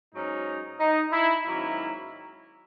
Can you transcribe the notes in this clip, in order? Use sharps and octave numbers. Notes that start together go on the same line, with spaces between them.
G#2 F#3 C#4 D#4
D#4
E4
G#2 D#3 F#3 A#3 C#4 E4